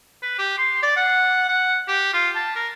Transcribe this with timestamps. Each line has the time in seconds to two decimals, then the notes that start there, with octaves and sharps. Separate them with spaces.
0.22 B4
0.39 G4
0.58 C6
0.82 D5
0.96 F#5
1.48 F#5
1.88 G4
2.13 F4
2.35 A5
2.55 A#4